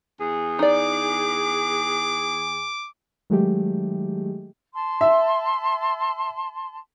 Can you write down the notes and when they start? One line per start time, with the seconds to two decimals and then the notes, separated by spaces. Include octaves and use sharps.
0.19 E2 G#4
0.59 D#4 D5 D6
3.30 D#3 F#3 G#3 A3 G4
4.75 A5 C6
5.01 E5